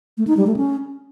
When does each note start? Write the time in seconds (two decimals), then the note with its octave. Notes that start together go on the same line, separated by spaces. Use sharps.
0.18 A3
0.27 D#4
0.37 G3
0.47 A3
0.57 C#4